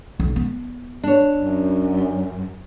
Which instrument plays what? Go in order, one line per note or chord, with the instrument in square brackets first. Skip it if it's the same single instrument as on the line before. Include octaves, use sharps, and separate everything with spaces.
[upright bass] B1
B3
[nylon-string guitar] D4 C#5
[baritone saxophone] F#2